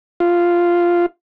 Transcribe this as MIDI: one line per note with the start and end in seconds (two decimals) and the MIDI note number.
0.20 1.06 65